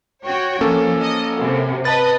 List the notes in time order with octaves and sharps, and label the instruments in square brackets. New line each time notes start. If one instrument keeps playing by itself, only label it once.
[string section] F#4 C#5 G5
[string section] F3 [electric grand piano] A#3 C#4 A4
[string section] D#5
F#2 C3
[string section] B4 D#5 [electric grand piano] A5 A6